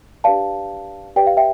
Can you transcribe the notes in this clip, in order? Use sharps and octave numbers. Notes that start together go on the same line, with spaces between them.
D4 G4 B4 D5 F5 A5
G4 B4 D5 G5
F5
E5 G5